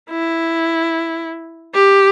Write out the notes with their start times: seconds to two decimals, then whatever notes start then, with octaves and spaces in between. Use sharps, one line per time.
0.10 E4
1.74 G4